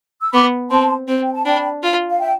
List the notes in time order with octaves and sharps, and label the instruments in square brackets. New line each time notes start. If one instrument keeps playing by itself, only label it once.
[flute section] E6
[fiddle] B3 [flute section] B5 D6
[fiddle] C4 [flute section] A5 C6
[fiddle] C4
[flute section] G5
A5
[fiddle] D4 [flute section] G5 B5
[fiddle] F4
[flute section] F5
E5 G5